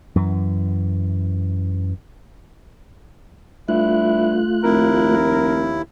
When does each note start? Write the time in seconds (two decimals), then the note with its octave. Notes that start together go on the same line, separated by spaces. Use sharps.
0.16 F#2 E3
3.68 G2 A3 E4 F4 F#6
4.64 F1 D#2 E4 A#4